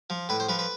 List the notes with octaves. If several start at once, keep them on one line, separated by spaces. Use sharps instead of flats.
F3
A2 B4
C5
F3 B4
B4